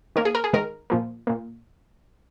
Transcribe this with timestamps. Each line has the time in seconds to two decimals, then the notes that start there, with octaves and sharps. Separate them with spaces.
0.16 D#3 A#3 A#4
0.25 G#4
0.35 A#4
0.44 G#4
0.53 D#3 G#3 A#4
0.90 A#2 F3 A#3
1.27 A#2 A#3